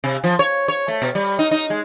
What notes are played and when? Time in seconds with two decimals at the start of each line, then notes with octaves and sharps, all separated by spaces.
0.04 C3
0.24 F3
0.39 C#5
0.68 C#5
0.88 A3
1.02 B2
1.15 G3
1.39 D#4
1.51 D#4
1.70 G#3